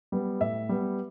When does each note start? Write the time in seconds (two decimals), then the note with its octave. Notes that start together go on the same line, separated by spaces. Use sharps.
0.12 G3 B3
0.40 A2 E5
0.69 G3 B3